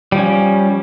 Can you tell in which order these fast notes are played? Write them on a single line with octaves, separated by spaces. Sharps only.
G3 F3 C#4